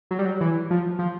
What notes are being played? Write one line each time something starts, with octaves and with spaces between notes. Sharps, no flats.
F#3
G3
F#3
E3
F3
F3